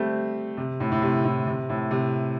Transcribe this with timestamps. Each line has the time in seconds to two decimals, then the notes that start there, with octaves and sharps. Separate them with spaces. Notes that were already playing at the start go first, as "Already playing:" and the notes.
Already playing: G3 A3 C4
0.57 C3
0.80 A2
0.92 A2
1.02 C3
1.25 A2
1.47 C3
1.69 A2
1.91 C3